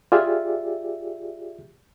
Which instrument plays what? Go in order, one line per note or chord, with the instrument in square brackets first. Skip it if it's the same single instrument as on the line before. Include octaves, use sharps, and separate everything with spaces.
[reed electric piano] F4 G4 G#4 D5 E5